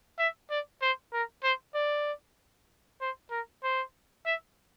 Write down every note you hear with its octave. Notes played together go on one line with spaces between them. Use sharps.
E5
D5
C5
A#4
C5
D5
C5
A#4
C5
E5